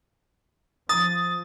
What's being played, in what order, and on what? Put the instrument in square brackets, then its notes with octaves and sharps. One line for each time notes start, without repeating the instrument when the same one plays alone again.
[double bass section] F3 [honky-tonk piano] D#6 [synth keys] A6